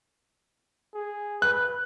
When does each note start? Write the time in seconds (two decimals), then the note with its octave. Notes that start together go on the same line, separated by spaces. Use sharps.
0.94 G#4
1.42 B4 F#6